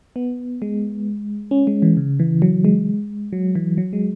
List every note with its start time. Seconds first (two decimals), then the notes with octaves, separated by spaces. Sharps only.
0.16 B3
0.62 G#3
1.51 C#4
1.67 G#3
1.82 E3
1.97 C#3
2.20 E3
2.42 F#3
2.65 G#3
3.33 F#3
3.55 E3
3.78 F#3
3.93 G#3